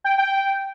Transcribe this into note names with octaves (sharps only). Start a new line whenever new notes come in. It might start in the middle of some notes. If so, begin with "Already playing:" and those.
G5
G5